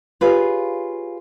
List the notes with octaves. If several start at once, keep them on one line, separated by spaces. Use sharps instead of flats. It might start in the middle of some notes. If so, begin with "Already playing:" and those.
F4 G4 G#4 B4 C#5 F5